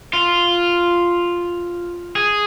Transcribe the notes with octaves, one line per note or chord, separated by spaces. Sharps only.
F4
G#4